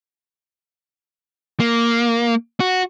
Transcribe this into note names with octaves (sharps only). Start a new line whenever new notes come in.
A#3
F#4